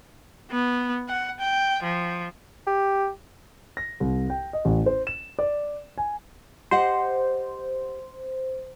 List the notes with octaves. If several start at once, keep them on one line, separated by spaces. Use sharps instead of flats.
B3
F#5
G5
F3
G4
A#6
C2
G5
D#5
A1
C5
E7
D5
G#5
G4 C5 D#5 F#5